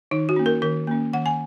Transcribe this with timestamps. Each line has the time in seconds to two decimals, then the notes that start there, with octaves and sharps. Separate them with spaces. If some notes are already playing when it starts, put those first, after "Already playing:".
0.11 D#3 D#4
0.29 F#4
0.36 A#3 C#4
0.46 A#4
0.62 D#3 A#4
0.87 A#3 C#4
1.13 D#3 F#5
1.26 G#5